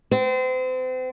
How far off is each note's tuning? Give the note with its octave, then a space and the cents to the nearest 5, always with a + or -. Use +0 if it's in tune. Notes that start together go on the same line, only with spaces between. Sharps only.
C4 -35